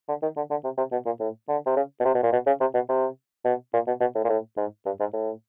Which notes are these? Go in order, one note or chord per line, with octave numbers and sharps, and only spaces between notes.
D3
D#3
D3
D3
C3
C3
B2
A#2
A2
D3
C3
C#3
B2
C3
B2
A#2
B2
C#3
C3
B2
C3
B2
A#2
B2
B2
A2
A#2
A2
G#2
G2
G#2
A2